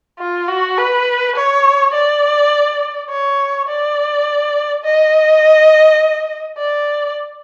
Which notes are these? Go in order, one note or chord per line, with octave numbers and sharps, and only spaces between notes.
F4
F#4
B4
C#5
D5
C#5
D5
D#5
D5